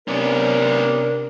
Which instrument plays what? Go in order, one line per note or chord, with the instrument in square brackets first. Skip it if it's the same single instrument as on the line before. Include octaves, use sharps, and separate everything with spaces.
[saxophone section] C3 D4 A#4 [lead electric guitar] B3 C#4